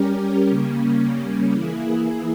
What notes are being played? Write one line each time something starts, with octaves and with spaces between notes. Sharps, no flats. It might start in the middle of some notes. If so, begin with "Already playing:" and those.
Already playing: G3 C#4 G4 A#4
C#3 G3 A#3 C#4
E3 A#3 E4 G#4